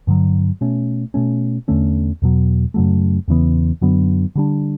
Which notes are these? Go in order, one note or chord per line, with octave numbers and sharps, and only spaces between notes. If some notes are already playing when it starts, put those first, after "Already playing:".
G2 D3 F#3
B2 A3 C#4
B2 A3 C#4
E2 D3 A3 C#4
E2 B2 F#3
F#2 C#3 F#3 A3
E2 C#3 E3 B3
F#2 D3 F#3 B3
D3 G3 D4